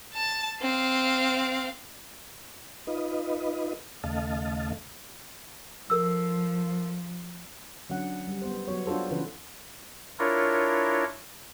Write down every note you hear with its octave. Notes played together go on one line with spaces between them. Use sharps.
A5
C4 F5
D#4 F4 B4 D#5
D#2 C#3 A3 D#5 F5 A5
F3 A4 A#4 E6
D3 F#3 C#4 F#5
G3
B3 C5
F#3 B3 F#4 C#5
D4 F4 F#4 A4 C5
C#3 E3 B4
D4 E4 F4 A#4 C#5